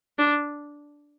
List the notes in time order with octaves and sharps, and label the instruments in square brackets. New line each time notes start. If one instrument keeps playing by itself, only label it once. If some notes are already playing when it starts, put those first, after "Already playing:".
[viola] D4